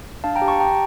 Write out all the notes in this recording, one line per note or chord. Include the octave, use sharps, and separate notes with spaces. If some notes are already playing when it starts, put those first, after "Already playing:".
D4 F5 A5
G5 A#5
G4
A5 C#6
G4 G5 A#5